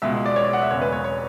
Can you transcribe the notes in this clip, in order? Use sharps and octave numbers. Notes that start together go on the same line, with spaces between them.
C#2 B2 G#3 E5
D5
C#5
D5
F#5
E5
E1 E2 C#3 G#3 C#5
B4
C#5
C#5